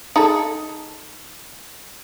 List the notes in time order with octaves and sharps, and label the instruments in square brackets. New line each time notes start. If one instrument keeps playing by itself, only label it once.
[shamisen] D#4 G#4 A4